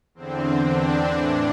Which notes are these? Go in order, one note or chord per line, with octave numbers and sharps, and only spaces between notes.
E2 D3 C4
D4
A2 E3